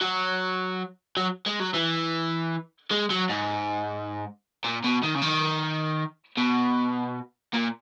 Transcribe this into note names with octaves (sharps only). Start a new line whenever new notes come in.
F#3
F#3
G#3
F#3
E3
G#3
F#3
G#2
A#2
B2
D#3
C#3
D#3
B2
A#2